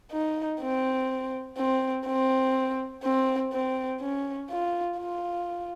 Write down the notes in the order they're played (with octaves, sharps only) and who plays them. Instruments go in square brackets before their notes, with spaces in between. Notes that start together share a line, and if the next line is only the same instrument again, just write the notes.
[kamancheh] D#4
C4
C4
C4
C4
C4
C#4
F4
F4